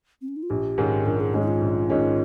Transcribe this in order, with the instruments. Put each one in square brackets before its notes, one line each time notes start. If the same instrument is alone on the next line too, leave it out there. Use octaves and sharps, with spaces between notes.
[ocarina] C4
C#4
D#4
F4
[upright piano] A#1 [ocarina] G4
[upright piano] G#2 D#3 G#3 C#4
[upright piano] A#1 [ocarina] A#4
[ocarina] G#4
[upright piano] G#2 D#3 G#3 C#4 [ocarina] G4
[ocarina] D#4
F4
[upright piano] A#1
G#2 D#3 G#3 C#4